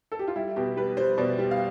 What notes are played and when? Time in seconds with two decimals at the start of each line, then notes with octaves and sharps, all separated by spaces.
0.12 A4
0.19 G4
0.28 F4
0.36 G3 E4
0.56 B2 G4
0.77 G3 B4
0.97 G3 C5
1.18 B2 D5
1.39 G3
1.51 F5